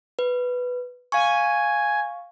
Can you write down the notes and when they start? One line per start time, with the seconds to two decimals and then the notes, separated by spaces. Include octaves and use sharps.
0.19 B4
1.12 F5 G#5 C#6